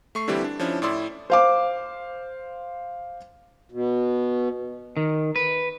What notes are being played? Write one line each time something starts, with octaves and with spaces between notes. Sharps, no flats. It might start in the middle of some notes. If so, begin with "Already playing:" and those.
A3 C#6 C7
D3 E3 G3 C4 E4 G4
D4
F3 C#4 D4 E4
A2 E4 D5 C6 E6
C5 F5 D6
B2
D#3
B4